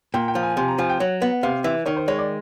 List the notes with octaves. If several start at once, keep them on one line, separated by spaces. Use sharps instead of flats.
A#2 G5
G5
F3
G#5
C3 G#5
A#5
F3 G#5
G5
F#3 F#5
B3
C3 F5
E3 E5
D#3 C#5
C5
G#3 C#5
D5